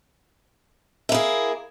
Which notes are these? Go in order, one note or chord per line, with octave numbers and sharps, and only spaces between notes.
A#3 E4 G#4